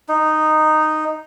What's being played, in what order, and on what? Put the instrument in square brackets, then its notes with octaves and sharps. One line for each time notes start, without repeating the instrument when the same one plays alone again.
[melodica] D#4